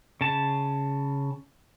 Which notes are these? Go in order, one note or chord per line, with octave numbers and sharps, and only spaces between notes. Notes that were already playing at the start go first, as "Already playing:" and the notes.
C#3 A5